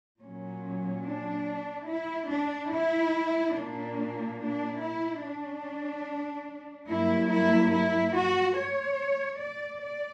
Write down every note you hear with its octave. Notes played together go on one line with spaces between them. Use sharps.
A#2 F#3 C#4
D4
E4
D4
E4
A#2 A#3 D4
D4
E4
D4
G2 F#3 A#3 E4
E4
E4
F#4
C#5
D5
D5